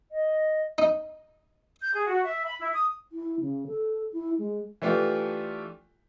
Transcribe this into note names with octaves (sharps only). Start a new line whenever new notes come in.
D#5
D#4
G6
G#4
F#4
E5
B5
E4
D#6
E4
C#3
A4
E4
G#3
E3 A3 D4 F4 G4